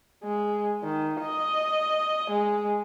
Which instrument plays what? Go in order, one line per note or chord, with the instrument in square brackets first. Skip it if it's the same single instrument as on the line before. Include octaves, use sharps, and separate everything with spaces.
[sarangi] G#3
D#3
D#5
G#3